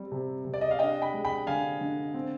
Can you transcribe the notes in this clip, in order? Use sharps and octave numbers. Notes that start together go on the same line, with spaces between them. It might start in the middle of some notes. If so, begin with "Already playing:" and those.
Already playing: G3 C4
C3
C3
D5
D#5
F5
D4 D#5 G5
G5 B5
G#3
G5 B5
D3 F5 G#5
D3
C4